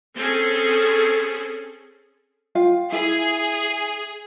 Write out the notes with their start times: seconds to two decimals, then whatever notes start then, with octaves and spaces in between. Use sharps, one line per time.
0.17 C4 C#4 G#4 A4
2.55 F4 F5 G5
2.92 E4 G#4